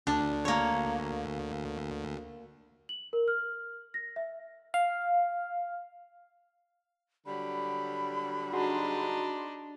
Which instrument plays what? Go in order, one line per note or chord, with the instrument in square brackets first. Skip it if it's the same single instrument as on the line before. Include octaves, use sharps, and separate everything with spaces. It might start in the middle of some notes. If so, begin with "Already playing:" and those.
[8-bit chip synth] D2 [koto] D4
[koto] A#3 C#5
[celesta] F#7
A#4
F6
A#6
E5
[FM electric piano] F5
[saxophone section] D3 F#3 G3 [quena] B5
[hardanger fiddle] D4 D#4 [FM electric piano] F#4 G#4 C6